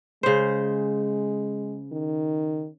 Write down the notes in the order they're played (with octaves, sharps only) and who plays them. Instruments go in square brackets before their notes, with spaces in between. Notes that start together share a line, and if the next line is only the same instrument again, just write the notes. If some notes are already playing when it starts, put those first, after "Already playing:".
[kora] C#3 C5 [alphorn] G#3
[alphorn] D#3